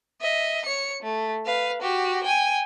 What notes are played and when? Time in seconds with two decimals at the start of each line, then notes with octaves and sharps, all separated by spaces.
0.21 D#5 E5
0.65 C#5 C#7
1.03 A3
1.46 B4 F5
1.81 F#4 G4
2.24 G5 G#5